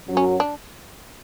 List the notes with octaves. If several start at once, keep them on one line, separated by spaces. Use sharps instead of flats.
F#2 F#3
C#4
D4